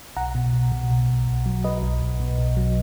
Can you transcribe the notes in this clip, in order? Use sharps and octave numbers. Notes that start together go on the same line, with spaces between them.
B1 F#5 A#5
B2
B1
B2
B1
B1
B1
F#3
F#3 B4 D#5
B1
B1
B2
B1
F#3